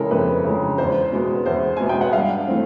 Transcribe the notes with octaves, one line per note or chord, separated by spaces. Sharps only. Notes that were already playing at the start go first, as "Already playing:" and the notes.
Already playing: F2 C#3 E3 G#3 A4 A#4
F2 B4
C#3 E3 G#3
E2 C5
B2 G#3 B3
E2 C5
B2 G#3 B3 G#5
G5
F#5
G2 F5
E3 A3 C4